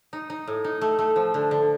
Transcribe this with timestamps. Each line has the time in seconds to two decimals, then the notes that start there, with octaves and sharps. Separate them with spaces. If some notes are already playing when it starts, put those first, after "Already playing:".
0.13 D#4
0.30 D#4
0.47 A2
0.64 D#4
0.81 A3
0.99 A3
1.16 F3
1.34 D3
1.51 D3